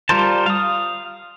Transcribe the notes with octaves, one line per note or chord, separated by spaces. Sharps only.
G3 F4 A#4 C5 A5
F5 D#6